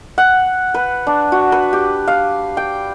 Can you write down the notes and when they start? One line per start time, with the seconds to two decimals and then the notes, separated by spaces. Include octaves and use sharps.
0.18 F#5
0.74 B4
1.07 D4
1.32 F#4
1.52 B4
1.73 G4
2.08 F5
2.57 G5